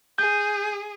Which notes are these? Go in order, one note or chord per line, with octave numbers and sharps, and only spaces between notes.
G#4 G6